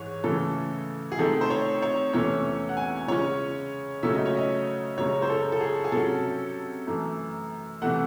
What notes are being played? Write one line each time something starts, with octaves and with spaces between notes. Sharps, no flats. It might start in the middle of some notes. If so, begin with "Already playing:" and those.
Already playing: G#2 E3 G#3 C#5
C#3 E3 A3 C#4 A4
G#4
C3 D#3 A3 C4 A4
C5
C#5
C#5
E2 C3 E3 A3 C#4 C#5
F#5
G#5
C#3 G#3 C#4 C#5
C#3 F#3 A3 C#4 E5
D#5
C#5
D#5
F#2 C#3 G#3 C#4 C#5
C5
A4
A4
G#4
G#4
C3 F#3 C#4 A4
F#2 E3 A3
C3 E3 A3 F#5